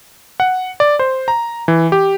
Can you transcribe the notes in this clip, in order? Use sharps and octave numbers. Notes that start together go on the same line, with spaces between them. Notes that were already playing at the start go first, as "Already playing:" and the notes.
F#5
D5
C5
A#5
E3
G4